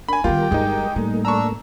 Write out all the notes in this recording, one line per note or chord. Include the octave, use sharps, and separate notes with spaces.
D4 A#4 G#5 B5
D#3 G3 B3 F4 G4 A#4 G5
G1 G2 G#3 D#4
A2 G3 A3 A#3
D4 A#5 C#6 E6